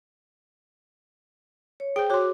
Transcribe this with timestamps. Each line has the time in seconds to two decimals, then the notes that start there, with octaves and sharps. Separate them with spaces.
1.80 C#5
1.96 G#4 C5 G5
2.10 F#4 C#5 C6 D6